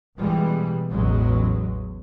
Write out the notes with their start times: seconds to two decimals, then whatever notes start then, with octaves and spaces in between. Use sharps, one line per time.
0.18 B2 E3 G3 G#3
0.89 A1 E2 F#3 G#3